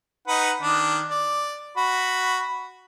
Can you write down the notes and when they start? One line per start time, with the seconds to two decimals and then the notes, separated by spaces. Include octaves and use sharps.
0.27 D#4 B4 F#5
0.62 D#3 D4
1.10 D5
1.77 F#4 B5